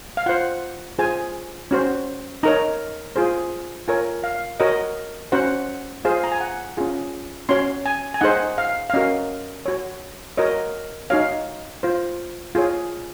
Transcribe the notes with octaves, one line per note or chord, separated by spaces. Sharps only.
F5
F4 C5 F#5
F4 G#4 C5 G#5
C#4 F#4 C5
D#4 A#4 C#5 A#5
F4 G#4 C5
F4 A#4 C#5 G#5
F5
F#4 A#4 C#5 D#5
C#4 F#4 C5 F#5
F4 G#4 C5 F5
A#5
G#5
F#5
C#4 F4 G#4
C#4 F#4 C#5 C6
G#5
G#5
D#4 G#4 C5 F#5
F5
F5
C#4 F#4 A#4 D#5
F#4 C#5
F#4 A#4 C#5 D#5
D#4 F#4 C#5 F5
F4 C5
F4 G#4 C#5